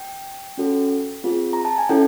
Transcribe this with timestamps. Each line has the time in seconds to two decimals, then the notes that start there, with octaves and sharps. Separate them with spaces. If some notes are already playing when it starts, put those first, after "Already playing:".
Already playing: G5
0.58 C#4 F#4 A4
1.24 C4 F4 G#4
1.53 A#5
1.65 A5
1.78 G#5
1.89 C#4 E4 A4 G5